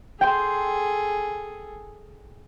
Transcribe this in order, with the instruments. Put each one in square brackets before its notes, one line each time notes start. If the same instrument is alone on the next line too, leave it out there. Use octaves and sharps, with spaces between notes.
[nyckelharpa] G#4 A4 [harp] G5 C6